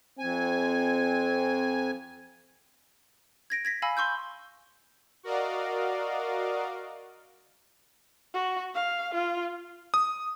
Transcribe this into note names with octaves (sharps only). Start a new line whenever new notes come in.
F2 C4 G#5
G#6 A#6 D7
G#6 A#6 B6
F5 G#5 B5 E6
C6 C#6 E6 G6
F#4 A#4 D5 D#5 F5
F#4
F5
F4
D#6